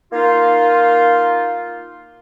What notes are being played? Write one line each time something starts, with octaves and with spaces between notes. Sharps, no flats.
A#3 D#4 F4